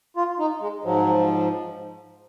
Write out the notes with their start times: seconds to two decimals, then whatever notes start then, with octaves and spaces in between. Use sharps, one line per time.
0.17 F4
0.39 D#4
0.61 G#3
0.84 G#2 F3 F#3